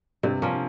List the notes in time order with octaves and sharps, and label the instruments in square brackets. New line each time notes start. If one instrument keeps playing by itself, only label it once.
[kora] G2 [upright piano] C3
[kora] F3 A#3 C#4